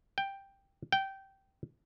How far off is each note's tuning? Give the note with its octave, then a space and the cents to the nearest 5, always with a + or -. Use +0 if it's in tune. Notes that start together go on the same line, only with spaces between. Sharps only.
G5 +5
G5 -15